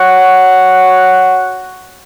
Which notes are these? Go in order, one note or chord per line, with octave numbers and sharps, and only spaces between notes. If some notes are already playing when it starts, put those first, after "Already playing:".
Already playing: F#4 C#5 F#5